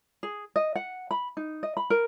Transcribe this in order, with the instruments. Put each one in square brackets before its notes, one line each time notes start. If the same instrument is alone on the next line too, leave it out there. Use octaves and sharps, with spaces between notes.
[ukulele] G#4
D#5
F#5
B5
D#4
D#5
B5
A#4